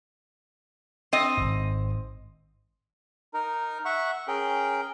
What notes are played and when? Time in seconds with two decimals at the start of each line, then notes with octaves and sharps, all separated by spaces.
1.13 C4 D#5
1.37 G#1 G#2
3.34 D#4 A#4
3.85 E5 F#5 C#6
4.28 C#4 G#4 A#4 G5